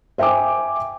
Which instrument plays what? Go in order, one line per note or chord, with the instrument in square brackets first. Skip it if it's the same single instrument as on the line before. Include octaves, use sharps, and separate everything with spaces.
[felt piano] C5 E5 G5 G#5 D6